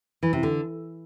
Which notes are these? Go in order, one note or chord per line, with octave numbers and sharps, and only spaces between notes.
E3
C3
D3